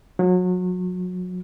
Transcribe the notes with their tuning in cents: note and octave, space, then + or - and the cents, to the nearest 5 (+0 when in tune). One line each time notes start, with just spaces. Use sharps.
F#3 -30